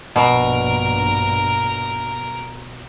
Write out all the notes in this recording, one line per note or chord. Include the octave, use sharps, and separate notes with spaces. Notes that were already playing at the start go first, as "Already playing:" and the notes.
A#1 G2 B2 A#4